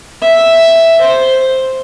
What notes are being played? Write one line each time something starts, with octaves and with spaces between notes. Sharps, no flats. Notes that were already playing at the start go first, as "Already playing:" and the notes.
E5
C5